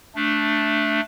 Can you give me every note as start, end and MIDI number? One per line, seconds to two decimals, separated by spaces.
0.16 1.01 57
0.16 1.01 62